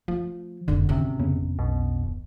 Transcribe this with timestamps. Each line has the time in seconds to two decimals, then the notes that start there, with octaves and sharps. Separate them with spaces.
0.08 F3 A3
0.68 F1 G#2 D3
0.89 G#1 C3 C#4 D4
1.20 F2 C#3 B3
1.59 B1 B2
2.04 D1